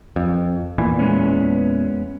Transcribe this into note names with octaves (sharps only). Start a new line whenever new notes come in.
F2
E2 A#2 E3
G#3 B3 C#4